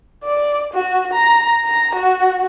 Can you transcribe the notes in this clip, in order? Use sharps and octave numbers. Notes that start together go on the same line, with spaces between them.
D5
F#4
A#5
A#5
F#4